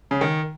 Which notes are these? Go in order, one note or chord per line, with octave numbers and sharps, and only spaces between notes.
C#3
D#3